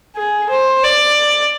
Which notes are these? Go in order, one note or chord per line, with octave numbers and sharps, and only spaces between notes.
G#4
C5
D5